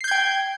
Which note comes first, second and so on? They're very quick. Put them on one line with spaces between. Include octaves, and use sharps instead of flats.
C7 G6 G#6 G5